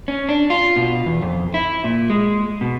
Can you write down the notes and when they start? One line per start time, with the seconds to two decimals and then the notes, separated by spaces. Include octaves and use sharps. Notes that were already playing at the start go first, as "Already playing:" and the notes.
0.08 C#4
0.29 D4
0.50 F4
0.76 B2
1.06 E2
1.22 F2
1.54 E4
1.84 A#2
2.10 G#3
2.61 B2